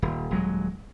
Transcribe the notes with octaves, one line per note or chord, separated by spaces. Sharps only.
D#1
D#1 F#3 G#3